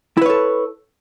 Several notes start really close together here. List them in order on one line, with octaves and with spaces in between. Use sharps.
E4 B4 C#5 A4